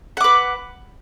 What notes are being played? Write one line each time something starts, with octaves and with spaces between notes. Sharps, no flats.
B4 F#5 D6